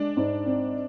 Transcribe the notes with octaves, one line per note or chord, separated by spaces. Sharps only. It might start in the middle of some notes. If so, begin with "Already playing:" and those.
Already playing: G#3 D4
G#2
C4